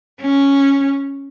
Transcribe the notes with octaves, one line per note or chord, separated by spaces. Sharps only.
C#4